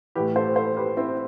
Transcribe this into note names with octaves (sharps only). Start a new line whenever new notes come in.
A2 E3 G4 B4
A4 C5
A4 C5
G4 B4
C4 E4